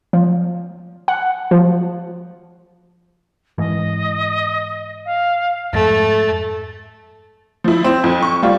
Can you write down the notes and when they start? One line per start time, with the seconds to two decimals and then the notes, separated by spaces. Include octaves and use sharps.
0.13 F3
1.08 F#5
1.51 F3
3.58 G#2 E3 D#5
5.05 F5
5.73 F2 G#2 A3 A6
7.64 F3 E4
7.84 C4
8.04 F2
8.22 C#6
8.42 G3 F4